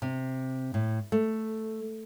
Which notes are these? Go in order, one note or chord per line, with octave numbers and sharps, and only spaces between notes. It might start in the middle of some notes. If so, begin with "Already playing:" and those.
C3
A2
A3